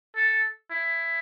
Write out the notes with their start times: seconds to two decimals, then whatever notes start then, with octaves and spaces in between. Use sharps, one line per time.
0.16 A4
0.71 E4